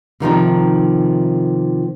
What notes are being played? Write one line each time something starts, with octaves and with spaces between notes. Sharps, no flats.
C3 D#3 F3 D#4